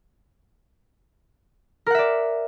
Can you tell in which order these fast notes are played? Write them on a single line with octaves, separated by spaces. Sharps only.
A#4 F#5 E5 D5